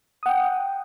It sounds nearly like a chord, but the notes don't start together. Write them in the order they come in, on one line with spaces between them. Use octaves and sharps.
D#6 F#5 G5